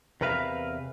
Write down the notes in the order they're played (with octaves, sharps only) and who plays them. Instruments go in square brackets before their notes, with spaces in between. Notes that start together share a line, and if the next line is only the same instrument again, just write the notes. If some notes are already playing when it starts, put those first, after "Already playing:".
[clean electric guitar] E2 C3 A#4 B4 E5 F5